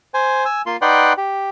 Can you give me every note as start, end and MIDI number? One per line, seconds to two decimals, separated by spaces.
0.14 0.45 72
0.14 0.45 80
0.45 0.62 80
0.45 0.62 88
0.66 0.77 58
0.66 0.77 65
0.66 0.77 84
0.82 1.13 63
0.82 1.13 71
0.82 1.13 74
0.82 1.13 78
0.82 1.13 79
0.82 1.13 84
1.17 1.50 67